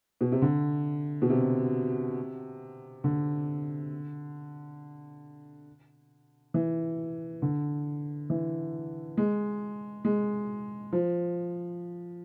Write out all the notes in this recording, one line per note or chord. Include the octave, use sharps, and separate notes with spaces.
B2
C3
D3
B2
C3
D3
E3
D3
E3
G#3
G#3
F3